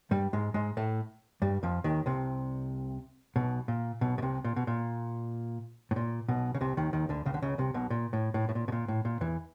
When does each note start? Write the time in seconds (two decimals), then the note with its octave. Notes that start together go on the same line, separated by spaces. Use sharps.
0.11 G2 G3
0.33 G#2 G#3
0.54 G#2 G#3
0.77 A2 A3
1.42 G2 G3
1.63 F2 F3
1.84 D#2 D#3
2.06 C2 C3
3.36 B1 B2
3.68 A#2
4.01 B1 B2
4.18 B2
4.22 C2 C3
4.44 A#2
4.56 B2
4.67 A#2
5.91 A2
5.96 A#2
6.28 B1 B2
6.54 C#3
6.61 C2 C3
6.77 D#2 D#3
6.93 D#2 D#3
7.09 D2 D3
7.26 C#2 C#3
7.34 D3
7.42 C#2 C#3
7.58 C2 C3
7.74 B1 B2
7.90 A#2
8.13 A2
8.34 A2
8.49 A2
8.55 A#2
8.68 B2
8.72 A#2
8.88 A2
9.05 A#2
9.21 E2 E3